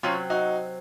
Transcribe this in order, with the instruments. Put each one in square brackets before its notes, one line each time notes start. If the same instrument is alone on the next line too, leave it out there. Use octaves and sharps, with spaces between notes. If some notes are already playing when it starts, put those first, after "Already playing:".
[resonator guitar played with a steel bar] C3 F#3 C4 [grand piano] C#4 F4
[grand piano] D#4 F#4